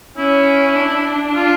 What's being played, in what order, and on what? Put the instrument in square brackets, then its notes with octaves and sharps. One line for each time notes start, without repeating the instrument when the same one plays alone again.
[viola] C#4 [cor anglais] E4
[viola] D4
[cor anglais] F4